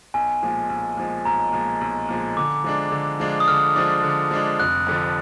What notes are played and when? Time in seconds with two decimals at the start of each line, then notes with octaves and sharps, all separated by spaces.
0.14 B1 G#5
0.43 A#2 F3 G#3
0.70 B1
0.97 A#2 F3 G#3
1.25 B1 A#5
1.53 A#2 F3 G#3
1.81 B1
2.08 A#2 F3 G#3
2.37 D3 D6
2.64 F3 G#3 D4
2.92 D3
3.20 F3 G#3 D4
3.40 D#6
3.48 D3 F6
3.76 F3 G#3 D4
4.03 D3
4.31 F3 G#3 D4
4.60 F1 F#6
4.87 F2 D3 F3